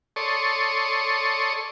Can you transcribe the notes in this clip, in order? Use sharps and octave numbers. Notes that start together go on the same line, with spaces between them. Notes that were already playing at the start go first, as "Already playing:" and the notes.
A4 C#5 D5 C6 C#6 D#6